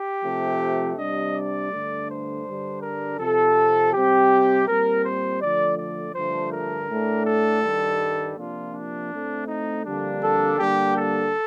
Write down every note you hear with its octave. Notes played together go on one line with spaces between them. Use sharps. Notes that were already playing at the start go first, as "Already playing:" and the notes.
Already playing: G4
C3 F3 A3
C3 G3 D4 D#5
D5
G2 D3 A3 D4
C5
G2 D3 G3 D4
A#4
F2 C3 F3 A4
C3 G3 C4 G4
A#2 G3 C4 A#4
C5
D3 F3 A3 D5
D5
G2 D3 F3 A3 D4 C5
A#4
A2 A3 D4
A4
G2 D#3 G3
C3 F3 A#3 D4 F4
D4
A2 A3 C4
D#4
F2 D3 G3 A#3 D4
A4
D3 G3 A#3 D4 G4
A4